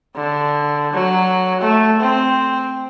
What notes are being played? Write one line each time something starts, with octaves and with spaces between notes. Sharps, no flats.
D3
F#3
A3
C4